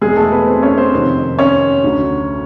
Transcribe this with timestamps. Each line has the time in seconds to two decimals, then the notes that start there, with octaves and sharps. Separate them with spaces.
0.02 E2 B2 F#3 G#3 G#4
0.17 A3 A4
0.32 B3 B4
0.47 C4 C5
0.62 C#4 C#5
0.78 C4 C5
0.93 F2 C3 D#3
1.39 C#4 C#5
1.84 D2 D3 F#3